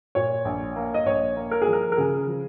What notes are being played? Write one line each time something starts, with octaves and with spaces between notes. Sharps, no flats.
A#2 C#5
A#1
A#3
D#5
A#1 C#5
A#3
A#4
G#4
F3
A#4
A#4
C#3 G#4
F3